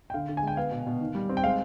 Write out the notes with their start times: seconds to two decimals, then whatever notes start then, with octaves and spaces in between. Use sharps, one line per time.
0.10 G5
0.14 D3 F5
0.29 D3
0.37 G#5
0.43 G#3 G5
0.57 B3 F5
0.71 B2
0.86 B2
1.01 D#3
1.15 G3
1.29 C4
1.37 G5
1.44 G#3 F5